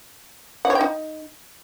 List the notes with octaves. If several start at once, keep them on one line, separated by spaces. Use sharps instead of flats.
F#5
C#5
G5
D#4